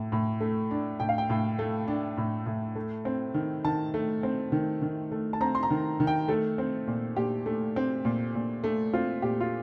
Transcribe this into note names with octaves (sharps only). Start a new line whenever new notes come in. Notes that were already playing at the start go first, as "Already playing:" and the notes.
Already playing: A2
A2
A3
D4
A2 G5
F5
G5
A2
A3
D4
A2
A2
A3
C4
D#3
D#3 A5
A3
C4
D#3
D#3
A3
A5
C4 A#5
C6
A#5
D#3
D#3
G5
A3 A4
C4
A#2
A#2 G4
A3
C4
A#2
A#2
A3
C4 F4
A#2 G4
F4